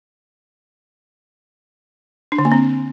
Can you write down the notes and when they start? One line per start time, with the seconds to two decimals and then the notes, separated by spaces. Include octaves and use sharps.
2.32 D4
2.39 D3
2.45 A#3
2.52 C4